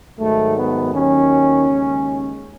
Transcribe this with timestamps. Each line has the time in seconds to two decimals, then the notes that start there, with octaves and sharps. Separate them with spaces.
0.18 G#2 D#3 F#3 A3
0.56 B3
0.93 D#2 D#3 F#3 C#4
1.68 D#2 C#3 G#3